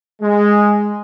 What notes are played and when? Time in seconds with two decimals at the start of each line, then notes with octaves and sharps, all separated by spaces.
0.22 G#3